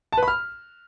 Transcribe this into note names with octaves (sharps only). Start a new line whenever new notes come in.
A5
B4
B5
F6